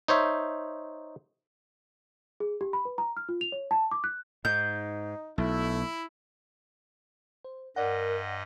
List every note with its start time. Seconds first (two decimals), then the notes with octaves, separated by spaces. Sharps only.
0.08 D#4 C5 C#5 E5
2.40 G#4
2.61 G4
2.73 B5
2.85 B4
2.98 A#5
3.17 F6
3.29 F4
3.41 F7
3.52 C#5
3.71 A5
3.91 D6
4.04 F#6
4.45 G#2 D#4 G6
5.38 B1 A3 E4
7.45 C5
7.76 G2 A#4 D5 D#5 F#5